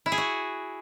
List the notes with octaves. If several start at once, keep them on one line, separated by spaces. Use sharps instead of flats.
E4
G#4
F#4